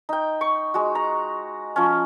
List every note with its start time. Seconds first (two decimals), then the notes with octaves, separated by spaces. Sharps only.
0.09 D#4 G5
0.41 C#6
0.74 G#3 F#4
0.95 A#5
1.76 F3 C#4